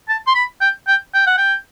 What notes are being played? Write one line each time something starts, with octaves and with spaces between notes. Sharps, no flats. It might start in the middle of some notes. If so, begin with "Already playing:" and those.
A5
C6
B5
G5
G5
G5
F#5
G5